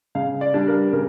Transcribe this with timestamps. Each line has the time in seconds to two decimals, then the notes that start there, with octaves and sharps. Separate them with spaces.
0.15 C#3 F5
0.41 D5
0.54 G3 D4
0.68 A#4
0.93 C#3 A#4